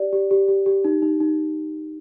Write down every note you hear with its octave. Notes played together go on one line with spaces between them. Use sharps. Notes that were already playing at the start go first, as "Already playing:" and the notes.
Already playing: G4 D5
G4
G4
G4
G4
D#4
D#4
D#4